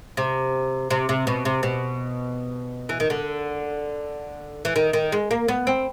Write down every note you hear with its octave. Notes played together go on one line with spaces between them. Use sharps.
C3
C3
C3
B2
C3
B2
E3
D#3
D3
E3
D#3
D#3
G#3
A#3
B3
C4